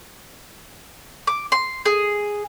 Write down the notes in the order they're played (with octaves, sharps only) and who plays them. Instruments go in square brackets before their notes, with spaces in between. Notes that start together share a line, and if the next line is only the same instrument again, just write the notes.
[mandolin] D6
C6
G#4